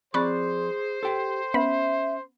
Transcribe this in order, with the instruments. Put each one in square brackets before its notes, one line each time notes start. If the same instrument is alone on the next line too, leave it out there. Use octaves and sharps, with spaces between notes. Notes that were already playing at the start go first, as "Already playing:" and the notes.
[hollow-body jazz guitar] F3 C4 D5 [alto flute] G#4 [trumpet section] C5 [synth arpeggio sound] B5 C#6 F#6
[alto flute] G4 [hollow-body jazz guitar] A4 G5
[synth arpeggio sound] B3 B5 [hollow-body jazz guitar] C#4 [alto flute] E5